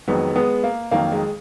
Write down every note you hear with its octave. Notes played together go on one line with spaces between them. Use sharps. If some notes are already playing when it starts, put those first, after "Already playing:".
F2 D#3 F#3 G#3 B3
G#3 B3
A#3
F2 D#3 F#3 A#3
G#3